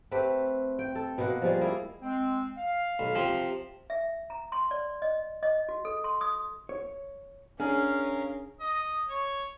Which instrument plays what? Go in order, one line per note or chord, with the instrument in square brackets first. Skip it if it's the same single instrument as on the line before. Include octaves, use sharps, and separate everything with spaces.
[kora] A3 C4 G4 B4
G5
A4
B2 A#3 F#5
F3 G3 G#3
A#3 E4 G#4
[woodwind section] G#3 C4
F5
[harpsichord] B1
C3 F3
[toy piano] E5
A#5
C6
D5
D#5
D#5
F#4
A4
C6
D#6
[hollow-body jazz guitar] C#5
[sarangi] C#4 [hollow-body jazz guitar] D4 [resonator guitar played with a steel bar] G#4 [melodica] A#4 F5
[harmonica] D#5
C#5